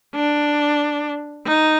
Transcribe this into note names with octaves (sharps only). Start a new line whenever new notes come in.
D4
D#4